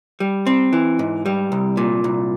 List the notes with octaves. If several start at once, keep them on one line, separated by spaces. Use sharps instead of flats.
G3
C4
E3
G#2
G3
C2
A#2
C2